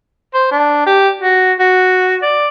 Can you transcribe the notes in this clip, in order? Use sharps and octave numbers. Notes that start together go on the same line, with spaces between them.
C5
D4
G4
F#4
F#4
D5